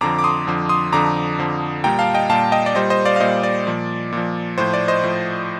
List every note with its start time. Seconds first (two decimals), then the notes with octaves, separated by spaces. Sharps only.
0.01 F2 D3 F3 A#5 D6
0.19 D6
0.24 C6 D#6
0.47 F2 D3 F3
0.69 C6 D#6
0.93 F2 D3 F3 A#5 D6
1.38 F2 D3 F3
1.84 A#2 G3 G5 A#5
1.99 F5 A5
2.14 D#5 G5
2.29 A#2 G3 F5 A5
2.52 D#5 G5
2.66 D5
2.75 A#2 G3 C5 D#5
2.90 C5 D#5
3.05 D5 F5
3.16 F5
3.20 A#2 G3 C5 D#5
3.43 D5
3.67 A#2 F3
4.12 A#2 F3
4.58 A2 F3 C5
4.73 D5
4.88 C5 D#5
5.03 A2 F3